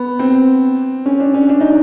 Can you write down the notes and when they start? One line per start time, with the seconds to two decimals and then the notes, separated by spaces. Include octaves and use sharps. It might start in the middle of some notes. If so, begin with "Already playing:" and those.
Already playing: B3
0.19 C4
1.06 C#4
1.20 D4
1.34 C#4
1.49 D4
1.60 D#4